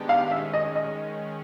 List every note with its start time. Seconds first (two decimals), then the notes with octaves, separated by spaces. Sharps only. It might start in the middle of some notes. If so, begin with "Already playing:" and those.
Already playing: D#3 G#3 B3 D4 G4
0.09 F5
0.31 D#3 G#3 C#4 E5
0.53 D#5
0.76 D#5